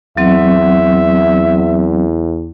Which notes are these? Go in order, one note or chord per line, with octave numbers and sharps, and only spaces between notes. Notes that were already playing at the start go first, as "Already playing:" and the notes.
E2 F#3 C4 E5